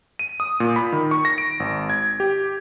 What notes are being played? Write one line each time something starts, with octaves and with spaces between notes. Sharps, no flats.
D#7
D#6
A#2
B5
D#3
C#6
A#6
D7
G#1
G#6
G4